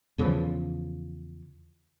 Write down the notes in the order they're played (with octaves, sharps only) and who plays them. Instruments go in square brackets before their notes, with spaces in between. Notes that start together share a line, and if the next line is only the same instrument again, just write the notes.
[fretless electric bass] E2 C#3 E3 F3